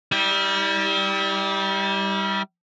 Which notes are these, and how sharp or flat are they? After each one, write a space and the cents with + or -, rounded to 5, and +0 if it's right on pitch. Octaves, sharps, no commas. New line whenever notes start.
G3 +0 E4 -40